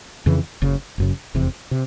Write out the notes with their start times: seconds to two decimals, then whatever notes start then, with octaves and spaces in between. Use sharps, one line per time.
0.26 F2 C#3 E3
0.62 F#1 F#2 C#3
0.98 F#1 F#2 C#3
1.34 F1 E2 C3
1.71 C3